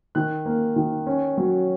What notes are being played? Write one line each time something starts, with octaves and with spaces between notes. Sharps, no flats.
D#3 F#6
A#3
D#3
C#4
F#3